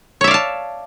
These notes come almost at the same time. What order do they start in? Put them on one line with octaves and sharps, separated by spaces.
C#5 E5 D5 F5 A5